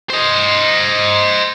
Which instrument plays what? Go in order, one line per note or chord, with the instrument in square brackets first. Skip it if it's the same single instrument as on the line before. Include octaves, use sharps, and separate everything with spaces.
[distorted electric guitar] C5 D#5